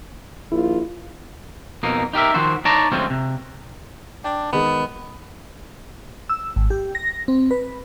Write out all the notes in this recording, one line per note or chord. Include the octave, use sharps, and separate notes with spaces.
A#1 D#2 E4 F4
F2 B2 A#3 D#4
D#4 G4 A#4 E5
D#3 F3 F#4 C5
D#4 C#5 D5 A5 A#5
D2 F3 G#3 C4 C#4
C3
D4 G5
D#3 G#3 B3
E6
G#1
G4
A#6
C4
B4